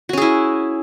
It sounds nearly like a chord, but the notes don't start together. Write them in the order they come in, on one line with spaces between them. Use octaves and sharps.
F#4 C#4 G#4 E4